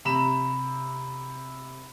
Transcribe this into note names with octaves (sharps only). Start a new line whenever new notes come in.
C3 A#5 B5 E7